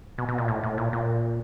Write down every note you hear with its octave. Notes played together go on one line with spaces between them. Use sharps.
B2
B2
A#2
A2
A2
A#2
A#2